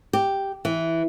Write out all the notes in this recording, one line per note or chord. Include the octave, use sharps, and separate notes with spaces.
G4
E3